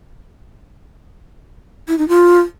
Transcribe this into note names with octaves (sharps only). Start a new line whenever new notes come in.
E4
D#4
F4